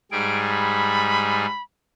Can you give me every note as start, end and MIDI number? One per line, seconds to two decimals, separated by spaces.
0.11 1.46 44
0.11 1.46 55
0.11 1.46 68
0.11 0.38 98
0.48 1.62 83